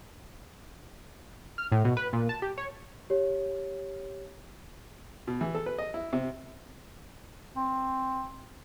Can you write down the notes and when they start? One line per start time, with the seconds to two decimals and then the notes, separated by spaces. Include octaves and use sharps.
1.58 F6
1.72 A2
1.85 B2
1.97 B4
2.13 A#2
2.29 A5
2.42 G4
2.58 C#5
3.10 G4 C#5
5.27 B2
5.41 E3
5.55 A4
5.66 B4
5.78 D#5
5.94 E4
6.13 C3
7.56 C4